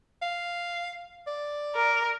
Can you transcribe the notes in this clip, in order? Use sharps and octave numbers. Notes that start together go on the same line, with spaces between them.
F5
D5
A#4